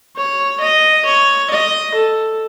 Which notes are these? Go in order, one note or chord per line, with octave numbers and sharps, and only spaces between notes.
C#5
D#5
C#5
D#5
A4